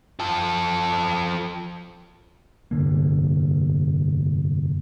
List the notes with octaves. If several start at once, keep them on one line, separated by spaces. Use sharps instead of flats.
F3 A4
F1 G2 D3 A#3